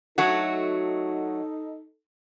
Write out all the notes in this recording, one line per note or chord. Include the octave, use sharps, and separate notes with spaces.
F#3 A3 D#4 F#4 A4